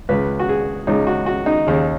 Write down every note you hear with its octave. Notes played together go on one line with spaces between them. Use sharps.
C#2 C#3 B4
F#4
G#4
C#2 C#3 D#4
F#4
F#4
D#4
D#2 C#3